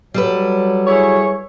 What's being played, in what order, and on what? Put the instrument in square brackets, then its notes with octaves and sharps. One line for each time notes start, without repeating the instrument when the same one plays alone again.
[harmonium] F#3 [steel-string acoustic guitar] G3 A4 B4
[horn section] E4 G#4 C#5